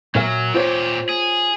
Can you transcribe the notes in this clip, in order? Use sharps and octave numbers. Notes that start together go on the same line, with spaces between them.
A#2 F#3 A#4 E5
A#2 F4 G4 C5 C#5
G#4